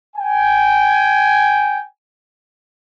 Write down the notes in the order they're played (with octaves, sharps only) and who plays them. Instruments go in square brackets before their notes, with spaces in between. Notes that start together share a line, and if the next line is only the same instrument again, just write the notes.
[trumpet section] G5 G#5